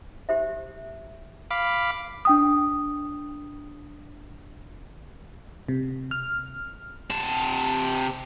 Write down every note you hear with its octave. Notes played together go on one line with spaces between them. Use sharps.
G4 C5 E5
F5 B5 D6
D4 G5 D#6
C3
F6
C3 A5